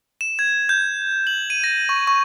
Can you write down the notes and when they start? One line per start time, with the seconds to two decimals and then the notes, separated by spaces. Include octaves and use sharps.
0.21 E7
0.39 G#6
0.69 G6
1.27 F#7
1.50 D#7
1.64 A#6
1.89 C#6
2.07 C#6